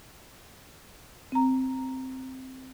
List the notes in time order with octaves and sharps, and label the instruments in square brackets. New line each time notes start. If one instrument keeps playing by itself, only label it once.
[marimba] C4 A#5